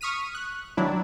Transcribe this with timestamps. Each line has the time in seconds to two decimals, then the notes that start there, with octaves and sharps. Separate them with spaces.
0.01 C#6 D#6 F6 B6 D#7
0.35 F#6
0.77 D#3 F#3 D4 E4